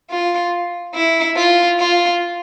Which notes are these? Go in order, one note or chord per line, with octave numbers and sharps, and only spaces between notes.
F4
E4
F4
F4